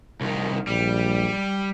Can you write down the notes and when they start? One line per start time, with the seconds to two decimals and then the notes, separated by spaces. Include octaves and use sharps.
0.21 C2 D#3
0.67 A#1 G3